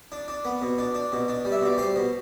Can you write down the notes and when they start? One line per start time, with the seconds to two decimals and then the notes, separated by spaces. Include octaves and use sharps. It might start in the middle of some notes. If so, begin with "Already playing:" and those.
0.12 D4
0.28 D4
0.45 B3
0.62 B2
0.78 D4
0.95 D4
1.12 B2
1.28 D4
1.45 G3
1.52 E5
1.61 B2 D5
1.78 G3 C5
1.96 B2